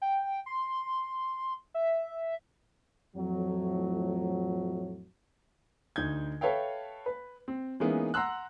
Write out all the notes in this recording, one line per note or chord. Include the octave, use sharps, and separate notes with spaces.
G5
C6
E5
F2 A2 F#3
D2 D#4 G6 G#6
A4 B4 C#5 E5 F5 G5
B4
C4
E3 G#3 A#3 B3 C#4 D#4
F#5 A#5 C6 E6 F#6